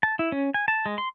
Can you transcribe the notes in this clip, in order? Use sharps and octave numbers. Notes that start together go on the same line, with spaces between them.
A5
E4
C#4
G#5
A5
G#3
C6